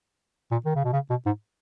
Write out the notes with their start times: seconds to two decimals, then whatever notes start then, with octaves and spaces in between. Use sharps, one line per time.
0.51 A#2
0.66 D#3
0.75 C#3
0.84 B2
0.93 C#3
1.10 B2
1.26 G#2